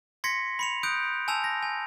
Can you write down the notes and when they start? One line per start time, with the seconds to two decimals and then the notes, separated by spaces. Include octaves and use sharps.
0.24 C6 G#6 A#6 B6 C#7
0.59 B5 C#7 F7
0.83 D#6 F#6 G6 D7
1.28 G#5 A5 E6 F7
1.44 A#6
1.63 G#5